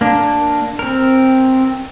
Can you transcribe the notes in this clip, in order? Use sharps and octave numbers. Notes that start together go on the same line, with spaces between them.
A#3 D4
C4 A#4